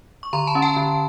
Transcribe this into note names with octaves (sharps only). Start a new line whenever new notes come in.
C#6
D3 A#5 C6
A5 B5
C#4
G5 A5
D3